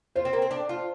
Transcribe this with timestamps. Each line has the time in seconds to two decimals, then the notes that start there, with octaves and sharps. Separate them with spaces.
0.16 F4 C5
0.25 C4
0.33 A#3
0.42 C4
0.51 D4
0.69 F4